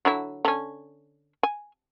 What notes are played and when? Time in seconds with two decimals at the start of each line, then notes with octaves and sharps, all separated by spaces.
0.05 D3 F#3 E4
0.45 D3 C#4
1.43 G#5